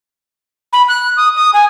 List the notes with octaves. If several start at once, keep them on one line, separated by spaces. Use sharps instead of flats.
B5
F#6
D#6
D#6
G#5